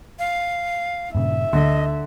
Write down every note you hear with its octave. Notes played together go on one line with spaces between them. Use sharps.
F5
G2 A#2 C#3 E5
D2 D3 D#5